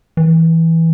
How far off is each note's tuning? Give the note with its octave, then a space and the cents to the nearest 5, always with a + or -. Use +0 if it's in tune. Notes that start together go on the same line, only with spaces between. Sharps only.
E3 -10